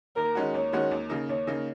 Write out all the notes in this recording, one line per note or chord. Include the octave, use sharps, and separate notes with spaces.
D#2 A#4
D#3 G#3 C#4 F#4
D#2 C#5
D#3 G#3 C#4 F#4
D#2
C#3 A#3 D#4
D#2 C#5
C#3 A#3 D#4